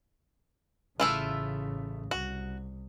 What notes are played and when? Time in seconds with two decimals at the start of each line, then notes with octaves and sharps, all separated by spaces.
1.00 A1 C#3 A3 E4 F4
2.11 C2 F#4